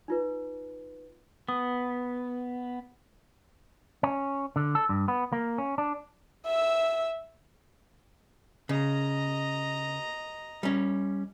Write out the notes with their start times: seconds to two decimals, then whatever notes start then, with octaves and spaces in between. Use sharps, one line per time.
0.08 D#4 F4 B4
1.48 B3 D#6
4.03 C#4
4.56 D3
4.75 A4
4.89 G2
5.08 B3
5.33 A#3
5.58 C#4
5.78 D4
6.46 E5 E6
8.69 C#3 D#5 A#5
10.63 G3 C#4